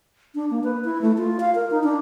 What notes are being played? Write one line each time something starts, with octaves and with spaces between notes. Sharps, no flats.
D4
A#3
B4
E4
A3
F4
F5
A#4
D#4
D4